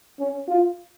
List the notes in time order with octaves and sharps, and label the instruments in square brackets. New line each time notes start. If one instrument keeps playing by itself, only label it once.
[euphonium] C#4
F4